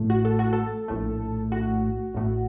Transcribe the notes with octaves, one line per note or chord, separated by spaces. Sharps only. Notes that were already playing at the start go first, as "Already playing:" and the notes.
Already playing: A1 A2 A3
F#4
A4
F#4
A4
A#1 A2 A3
F#4
A1 A2 A3